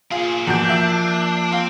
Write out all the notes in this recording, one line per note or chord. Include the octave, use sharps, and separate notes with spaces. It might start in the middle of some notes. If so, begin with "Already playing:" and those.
A#2 F4 G#4
E2 B2 F3 A#3 D4 G6
E5
C4 F5